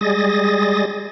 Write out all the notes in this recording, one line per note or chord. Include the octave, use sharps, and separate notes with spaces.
G3 G#3 G#4 D#6 A6 A#6